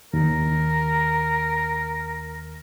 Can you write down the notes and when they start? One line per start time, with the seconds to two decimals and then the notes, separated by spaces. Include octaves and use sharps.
0.13 D#2 A#4